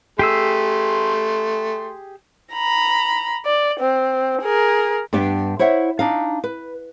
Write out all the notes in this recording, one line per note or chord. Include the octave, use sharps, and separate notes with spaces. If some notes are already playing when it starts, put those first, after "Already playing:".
A3 G4 G#4 C6 E6
A#5 B5
D5
C4
G#4 A#4
G2 B3 D4 G4 G5
E4 C5 C#5 E5 F#5
D4 D#4 F5
B4